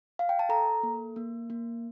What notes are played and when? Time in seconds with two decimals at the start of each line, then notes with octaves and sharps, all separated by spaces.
0.19 F5
0.29 G5
0.39 A5
0.49 A4 A#5
0.83 A#3
1.16 A#3
1.50 A#3